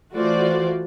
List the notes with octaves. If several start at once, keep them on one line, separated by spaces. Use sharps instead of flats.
E3 A3 F4 F#4 C5 D5